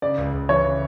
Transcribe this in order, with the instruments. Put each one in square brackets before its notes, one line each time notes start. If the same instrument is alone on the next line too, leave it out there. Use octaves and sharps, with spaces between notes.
[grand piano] C#3 [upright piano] D5
[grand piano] C#2
C#2
[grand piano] E3 [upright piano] C#5
[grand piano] C#3